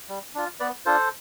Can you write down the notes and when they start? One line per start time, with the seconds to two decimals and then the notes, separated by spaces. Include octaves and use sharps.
0.09 G3
0.35 D4 F4
0.60 B3 B4 D5
0.85 D4 F4 A4 C5